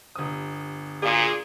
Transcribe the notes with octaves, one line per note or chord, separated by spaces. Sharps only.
G1 D#6
D2 A#2 F4 G#4